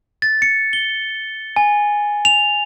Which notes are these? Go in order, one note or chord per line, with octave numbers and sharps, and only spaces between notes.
A6
C#7
G7
G#5
F7